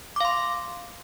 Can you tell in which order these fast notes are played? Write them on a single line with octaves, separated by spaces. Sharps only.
D6 F5 C6